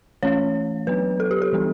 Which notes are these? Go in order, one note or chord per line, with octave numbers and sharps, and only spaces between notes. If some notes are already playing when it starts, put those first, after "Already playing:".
E3 A3 C#4 C#5
F#3 B3 D4 B4
A4
G4
A4
E3 G3 B3 D4